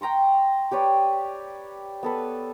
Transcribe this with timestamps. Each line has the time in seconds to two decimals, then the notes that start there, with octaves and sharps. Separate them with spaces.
0.01 G5 A#5 C6 C#6
0.71 G4 B4 C#5 D5
2.03 B3 A4 B4